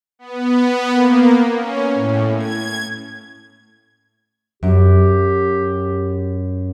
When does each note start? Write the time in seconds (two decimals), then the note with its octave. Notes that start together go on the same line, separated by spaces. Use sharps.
0.19 B3
0.90 A#3
1.54 C#4
1.94 A2
2.37 G#6
4.63 F#2 G4